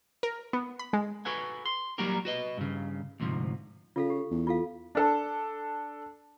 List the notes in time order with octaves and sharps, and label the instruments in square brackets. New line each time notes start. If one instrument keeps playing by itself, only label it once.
[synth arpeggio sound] A#4
B3
B5
G#3
[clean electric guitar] F#4 A4 B4 F#5 G#5
C6
F#3 G3 A#3 F#4 G4 A#4
F#4 B4 D#5
G2 C#3
D2 G#2 C3 F3
[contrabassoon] C#3 [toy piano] F4 A4 F5
[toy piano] G4
[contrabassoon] E2
[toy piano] F4 A4 F5
[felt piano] D4 A4